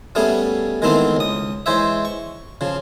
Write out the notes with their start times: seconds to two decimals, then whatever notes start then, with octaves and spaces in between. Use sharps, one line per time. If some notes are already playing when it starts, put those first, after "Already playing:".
0.15 G3 A3 B3 C#4 G#4
0.82 D#3 E3 G#3 A3 B3 C4
1.16 C#2 D#6
1.66 E3 G#3 C5 C#5 E5
2.05 C#6
2.61 C#3 F3